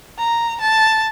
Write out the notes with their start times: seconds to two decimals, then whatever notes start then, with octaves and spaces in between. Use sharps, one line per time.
0.19 A#5
0.61 A5